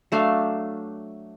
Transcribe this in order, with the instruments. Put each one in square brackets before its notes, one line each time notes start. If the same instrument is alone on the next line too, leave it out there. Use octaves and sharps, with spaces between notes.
[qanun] F#3 A3 D4 F5